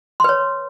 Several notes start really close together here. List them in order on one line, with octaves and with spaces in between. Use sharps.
C6 B4 C#5